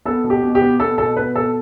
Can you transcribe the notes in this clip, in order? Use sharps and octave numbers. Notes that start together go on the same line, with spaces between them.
B3 A4
B2
G4
B2
G4
B3
B3 A4
B2 A4
B3 B4
B2 A4